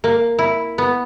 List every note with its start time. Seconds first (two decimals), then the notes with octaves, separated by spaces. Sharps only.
0.04 A#3
0.39 E4
0.78 B3